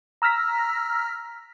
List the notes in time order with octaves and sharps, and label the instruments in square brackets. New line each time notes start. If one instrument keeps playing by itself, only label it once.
[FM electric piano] A#5 E6 F6 A#6 B6